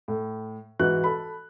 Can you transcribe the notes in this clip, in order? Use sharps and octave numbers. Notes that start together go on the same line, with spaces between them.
A2
G#2 E3 F#4 F#6
A4 B5